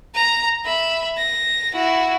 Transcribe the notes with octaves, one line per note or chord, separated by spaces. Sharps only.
A#5
E5 B5
A#6
E4 F#4